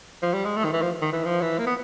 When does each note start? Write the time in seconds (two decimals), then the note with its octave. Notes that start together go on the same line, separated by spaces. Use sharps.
0.23 F3
0.34 G3
0.45 G#3
0.57 A3
0.65 D#3
0.73 E3
0.82 F3
1.02 D#3
1.13 E3
1.25 F3
1.41 E3
1.59 A#3
1.67 B3